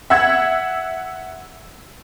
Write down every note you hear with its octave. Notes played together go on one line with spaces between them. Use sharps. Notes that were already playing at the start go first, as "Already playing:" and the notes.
E5 F#5 E6 G#6